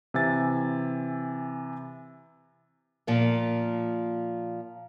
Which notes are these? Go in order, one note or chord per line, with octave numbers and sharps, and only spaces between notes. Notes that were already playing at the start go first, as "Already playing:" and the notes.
C3 E3 E5 G#5 A6
A#2 F3 A#3